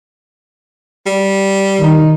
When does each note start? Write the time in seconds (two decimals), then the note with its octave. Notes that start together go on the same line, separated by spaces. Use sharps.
1.06 G3
1.78 D#3 D#4